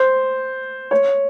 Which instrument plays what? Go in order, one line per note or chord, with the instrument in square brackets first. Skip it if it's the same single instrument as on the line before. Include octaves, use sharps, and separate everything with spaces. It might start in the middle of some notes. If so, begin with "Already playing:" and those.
Already playing: [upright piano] C5
C#5